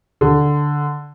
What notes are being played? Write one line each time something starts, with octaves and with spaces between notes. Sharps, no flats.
D3